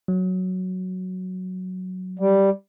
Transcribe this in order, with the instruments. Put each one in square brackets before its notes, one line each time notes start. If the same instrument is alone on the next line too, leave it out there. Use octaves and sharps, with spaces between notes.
[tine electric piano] F#3
[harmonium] G3